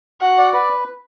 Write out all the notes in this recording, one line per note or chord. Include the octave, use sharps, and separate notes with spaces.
F#4 F#5
D5
B4